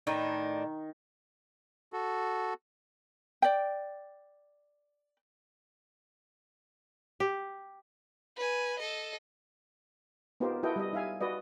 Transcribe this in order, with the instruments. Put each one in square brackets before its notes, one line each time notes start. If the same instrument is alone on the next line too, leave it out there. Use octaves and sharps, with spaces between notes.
[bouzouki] A2 D4 D#4 [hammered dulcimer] D#3
[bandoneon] F#4 A4
[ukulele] D5 G5
[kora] G4
[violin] B4 G#5
A4 D#5
[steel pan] B3 D#4 F4 G4 A#4 C5
E4 F#4 A4 B4 D#5 G5
G3 D#5
D#4 E5 F5 G#5
F#4 B4 D5 D#5